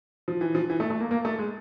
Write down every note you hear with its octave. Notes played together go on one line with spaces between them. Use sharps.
F3
E3
F3
E3
A3
A3
A#3
A#3
A3
G#3